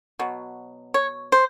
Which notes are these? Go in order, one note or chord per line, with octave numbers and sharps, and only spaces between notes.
B2 F#3
C#5
C5